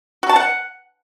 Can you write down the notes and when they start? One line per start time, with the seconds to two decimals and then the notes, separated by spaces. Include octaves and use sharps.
0.23 F#4
0.29 A5
0.36 F#5